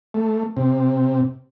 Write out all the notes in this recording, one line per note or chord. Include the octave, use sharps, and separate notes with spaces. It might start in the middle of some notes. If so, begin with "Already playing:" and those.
A3
C3